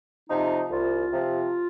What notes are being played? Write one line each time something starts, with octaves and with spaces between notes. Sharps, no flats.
C3 F3 D#4
C2 F4
C3 F3